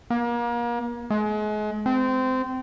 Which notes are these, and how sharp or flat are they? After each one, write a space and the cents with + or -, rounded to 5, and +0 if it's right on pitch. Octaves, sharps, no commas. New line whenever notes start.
A#3 +35
G#3 +35
C4 -20